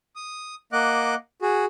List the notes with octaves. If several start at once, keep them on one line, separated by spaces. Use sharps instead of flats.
D#6
A#3 D#5 F#5 D6 F#6
F#4 G#4